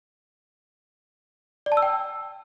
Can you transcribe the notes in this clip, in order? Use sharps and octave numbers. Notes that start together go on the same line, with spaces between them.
D5
A5
E6
G5